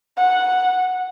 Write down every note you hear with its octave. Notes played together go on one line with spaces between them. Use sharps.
F#5